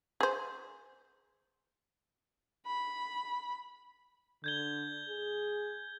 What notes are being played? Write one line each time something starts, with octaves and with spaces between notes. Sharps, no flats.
G#4 C5
B5
D3 G6 G#6 G7
G#4